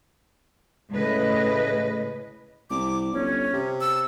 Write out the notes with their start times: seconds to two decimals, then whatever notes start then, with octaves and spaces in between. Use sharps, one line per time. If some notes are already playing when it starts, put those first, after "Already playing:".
0.92 A2 C#3 B4 D#5
2.70 C2 D6
3.13 G1 C#4
3.53 C3
3.81 E6